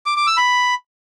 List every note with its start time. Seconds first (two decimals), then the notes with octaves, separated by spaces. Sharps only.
0.06 D6
0.16 D6
0.27 E6
0.37 B5